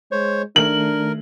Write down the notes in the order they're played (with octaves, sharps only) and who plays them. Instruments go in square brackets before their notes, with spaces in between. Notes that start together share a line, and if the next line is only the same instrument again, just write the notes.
[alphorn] G#3 [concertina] C5 C#5
[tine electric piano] D#3 A3 [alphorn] D4 [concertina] A#4 [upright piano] F#7